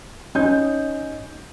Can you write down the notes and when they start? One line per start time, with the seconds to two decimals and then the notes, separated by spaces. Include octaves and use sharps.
0.35 C#4 D#4 G6